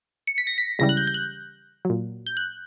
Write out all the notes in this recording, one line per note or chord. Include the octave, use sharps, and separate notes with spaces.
C#7
B6
A#6
B6
C#2 C#3 E3 G3 A#6
F#6
G6
G6
F#6
A#2 F#3
G6
F#6